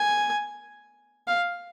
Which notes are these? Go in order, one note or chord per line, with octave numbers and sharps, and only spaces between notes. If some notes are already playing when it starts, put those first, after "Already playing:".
Already playing: G#5
F5